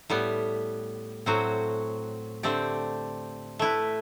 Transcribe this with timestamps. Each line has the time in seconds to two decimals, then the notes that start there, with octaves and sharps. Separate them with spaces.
0.10 A2 G3 B3
1.26 A2 F#3 C4 F#4
2.43 D3 A3 C4 G4 D5
3.59 A3 E4 B4